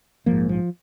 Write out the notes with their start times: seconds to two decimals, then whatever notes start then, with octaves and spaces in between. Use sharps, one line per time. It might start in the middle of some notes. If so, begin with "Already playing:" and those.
0.26 A#1 G#2 F3 A#3
0.49 F3